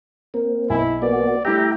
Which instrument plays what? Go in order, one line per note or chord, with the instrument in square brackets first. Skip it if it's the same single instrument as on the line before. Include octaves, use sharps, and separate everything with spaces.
[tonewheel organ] A#3 C4 [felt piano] A#4
[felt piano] B1 G#5 [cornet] E4
[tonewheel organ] A#3 B3 F#4 [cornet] D5
[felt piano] G3 A3 E4 [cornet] G4 [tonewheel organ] E5 G5 A#5